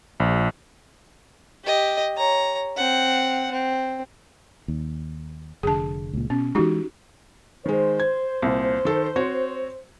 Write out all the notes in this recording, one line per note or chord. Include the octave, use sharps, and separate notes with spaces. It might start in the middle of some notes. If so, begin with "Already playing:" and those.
A#1
G4 D#5
C#5 A#5
C4 F#5
C4
D#2
F1 D3 G#4 A5
C#2 A#2
B2 C#4
E3 G#3 D#4 F#4 G4
D#3 G#3 C5
G#6
C2 A#2
D#3 A4
C4 F#4 C#5